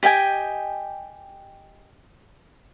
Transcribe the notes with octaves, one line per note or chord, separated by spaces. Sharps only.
G4 D#5 G5 G#5